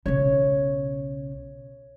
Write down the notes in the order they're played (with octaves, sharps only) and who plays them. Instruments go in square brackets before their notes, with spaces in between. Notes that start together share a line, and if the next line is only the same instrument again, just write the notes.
[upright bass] B1 C#3 [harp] C#5